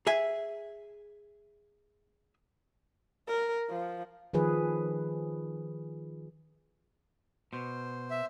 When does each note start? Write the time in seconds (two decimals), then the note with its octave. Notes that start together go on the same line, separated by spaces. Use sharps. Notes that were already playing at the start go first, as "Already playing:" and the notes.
0.07 G#4 E5 G#5
3.28 A#4
3.70 F3
4.33 D#3 F3 G#4 B4
7.53 B2 C5
8.11 E5